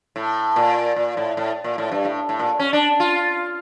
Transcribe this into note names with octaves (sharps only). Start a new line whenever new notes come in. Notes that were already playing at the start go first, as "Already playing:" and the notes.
A2
A#2
A#2
A2
A2
A#2
A2
G2
A2
A2
A#2
C#4
D4
F4